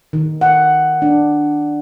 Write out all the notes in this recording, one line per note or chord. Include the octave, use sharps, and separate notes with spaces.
D#3
F#5
D4